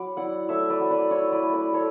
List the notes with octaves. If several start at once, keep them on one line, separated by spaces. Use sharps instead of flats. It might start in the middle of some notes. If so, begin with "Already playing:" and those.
Already playing: F#3 B5 D6
E4 D5 F#5
A3 C#5 E5
B4 D5
F#3
B4 D5
E4 C#5 E5
B4 D5
A3
B4 D5
E4 A4 C#5